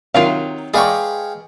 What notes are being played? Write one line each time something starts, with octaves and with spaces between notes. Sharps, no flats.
C3 D#3 F#3 F4 A#4 F5
G#3 G#4 B4 D5 F5 G5 C#6